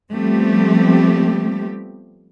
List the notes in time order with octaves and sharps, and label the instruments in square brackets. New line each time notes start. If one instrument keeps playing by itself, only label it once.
[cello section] F3 G3 A3 B3 C4 G4